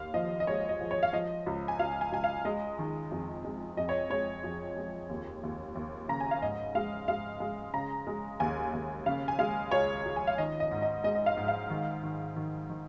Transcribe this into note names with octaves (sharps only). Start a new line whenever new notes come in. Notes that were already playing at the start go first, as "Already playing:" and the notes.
Already playing: D#2 F5
F3 D#5
D#5
G#3 C#5
D#5
F3
C#5
F5
F3 D#5
C#2
G#5
C#2 F5
G#5
C#2 G#5
F5
G#3 D#5
D#3
F2
G#3
F2 D#5
C#5
G#3 C#5
F2
G#3
D#2
D#2
D#2
C#3 A#5
G#5
F5
G#2 D#5
G#3 F5
G#3 F5
G#3
C#3 A#5
G#3
D#2 G#5
D#2
C#3 F5
G#5
G#3 F5
C#2 C#5
C#2
G#5
F5
D#3 D#5
D#5
G#2
D#5
G#3 D#5
D#5
F5
G#2
F5
D#3
D#3
D#3
D#3